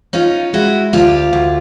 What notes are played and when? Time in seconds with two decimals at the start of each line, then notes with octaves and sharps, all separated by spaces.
0.13 C#4 D#4 F4
0.53 G#3 E4 F#4
0.93 D2 F4 G4
1.33 D2